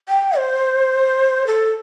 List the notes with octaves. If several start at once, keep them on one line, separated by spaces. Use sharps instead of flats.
G5
C5
A4